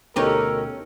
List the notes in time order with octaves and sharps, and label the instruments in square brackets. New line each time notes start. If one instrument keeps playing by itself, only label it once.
[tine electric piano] D2 B2 [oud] C#4 D#4 G4 [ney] A4 [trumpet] A#4